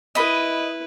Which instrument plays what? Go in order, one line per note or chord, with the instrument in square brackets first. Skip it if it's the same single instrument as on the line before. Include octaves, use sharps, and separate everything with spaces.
[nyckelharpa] E4 B4 [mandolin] D#5 B5